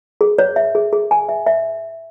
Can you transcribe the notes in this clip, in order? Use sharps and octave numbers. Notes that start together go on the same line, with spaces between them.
G#4
C#5
E5
G#4
G#4
G#5
E5
E5